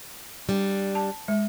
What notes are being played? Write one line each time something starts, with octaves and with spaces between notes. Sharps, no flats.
G3 D4
A5
G#3